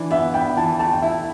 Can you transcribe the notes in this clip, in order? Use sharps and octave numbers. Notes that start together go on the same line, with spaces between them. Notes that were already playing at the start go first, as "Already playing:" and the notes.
Already playing: E3 D4
B3 E5
D4 G5
E3 A5
A3 A5
G5
E4 E5